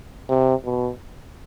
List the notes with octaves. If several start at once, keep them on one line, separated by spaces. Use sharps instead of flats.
C3
B2